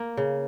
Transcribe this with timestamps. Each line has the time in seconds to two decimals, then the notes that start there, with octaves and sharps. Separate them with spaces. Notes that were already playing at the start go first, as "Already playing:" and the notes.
Already playing: A#3
0.17 C#3